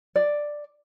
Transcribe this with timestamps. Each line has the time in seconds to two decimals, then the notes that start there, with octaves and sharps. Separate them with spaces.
0.16 D5